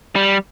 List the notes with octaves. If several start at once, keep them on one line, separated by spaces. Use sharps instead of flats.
G3